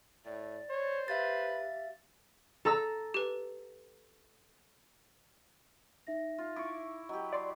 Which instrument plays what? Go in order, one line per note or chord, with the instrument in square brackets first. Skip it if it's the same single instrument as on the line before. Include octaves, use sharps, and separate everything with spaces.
[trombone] A2 [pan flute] D5
[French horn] C5 [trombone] C#5
[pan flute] G4 [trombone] B4 [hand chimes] E5 F5 A6
[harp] A4 A#5 E6
[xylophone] G4 B4
[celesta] D#4 E5 A#6
[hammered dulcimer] F4
[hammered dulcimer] E4 [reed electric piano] C#6 D6
[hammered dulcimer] F#3 G4 [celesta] D#5
[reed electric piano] D5 C6 D6